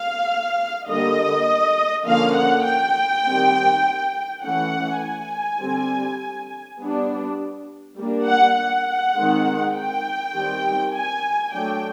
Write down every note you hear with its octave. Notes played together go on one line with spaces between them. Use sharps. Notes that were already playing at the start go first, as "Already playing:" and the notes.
Already playing: F5
D3 G3 A#3 D#5
D3 F3 A#3 C#4 F5
F#5
G5
D#3 G3 C4
E3 A3 C#4 F#5
G#5
D3 G3 C4
G3 B3 D4
G3 A#3 D4
F#5
F#5
D#3 G#3 C4
G5
D#3 G3 C4
G#5
F#3 A3 D4 G5